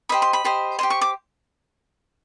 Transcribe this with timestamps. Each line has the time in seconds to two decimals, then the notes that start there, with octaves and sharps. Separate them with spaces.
0.09 G4 C5 D#5 B5
0.22 C6
0.33 B5
0.44 G4 C5 D#5
0.79 G4 C5 D#5 C6
0.90 C#6
1.01 D6